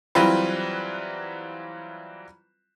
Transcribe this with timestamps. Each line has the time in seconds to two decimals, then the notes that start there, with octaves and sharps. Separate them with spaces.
0.15 E3 F#3 G3 C4 F4 B4